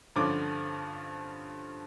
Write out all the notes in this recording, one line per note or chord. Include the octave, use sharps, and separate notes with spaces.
G2 D3 F3 C#4 D6